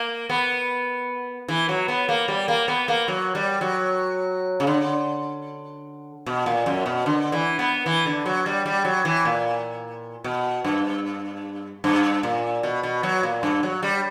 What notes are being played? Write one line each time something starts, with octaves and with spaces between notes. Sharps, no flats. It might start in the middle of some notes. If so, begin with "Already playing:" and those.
Already playing: A#3
B3
E3
F#3
B3
A#3
G3
A#3
B3
A#3
F#3
G3
F#3
C#3
D3
B2
A#2
F#2
B2
D3
E3
B3
E3
D3
F#3
G3
G3
F#3
E3
A#2
B2
G2
G2
A#2
B2
B2
F#3
A#2
G2
F#3
G3